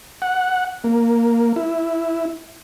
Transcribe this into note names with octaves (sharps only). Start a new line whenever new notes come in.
F#5
A#3
E4